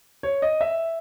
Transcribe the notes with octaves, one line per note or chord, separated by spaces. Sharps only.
C#5
D#5
E5